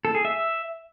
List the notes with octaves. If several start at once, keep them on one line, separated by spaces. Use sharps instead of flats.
A4
G#4
E5